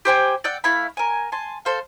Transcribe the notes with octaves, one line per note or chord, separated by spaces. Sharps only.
G4 C5 G5 G#5
D5 F#5 G5 E6
A3 E4 F5 B5
A#4 G#5
G#5 A5 C6
A4 C5 F5